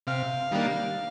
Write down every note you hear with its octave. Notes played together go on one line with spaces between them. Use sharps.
C3 F5
D#3 G3 A#3 D4